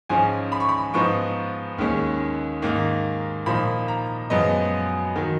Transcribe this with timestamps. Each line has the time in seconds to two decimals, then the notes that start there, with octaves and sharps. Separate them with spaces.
0.09 G#2 F3 G#3 C#4 G#5
0.52 B5
0.60 C#6
0.69 B5
0.94 G#2 F3 B3 D#4 C#6
1.78 D#2 D#3 G#3 C#4
2.62 G#2 D#3 A#3 D#4
3.46 A#2 F3 A#3 D#4 B5
3.88 A#5
4.30 F#2 F3 G#3 B3 D#5
5.16 D#3 F#3